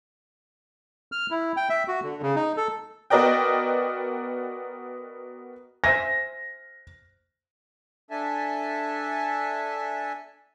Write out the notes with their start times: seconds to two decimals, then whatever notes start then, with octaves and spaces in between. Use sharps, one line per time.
1.12 F6
1.31 E4
1.57 G5
1.69 E5
1.88 F#4
2.03 D3
2.22 C#3
2.36 D#4
2.57 A4
3.10 B3 F#4 A#4 D5 D#5 G5
5.84 C5 E5 G#5 A#6
8.11 D4 A4 E5 G#5 A5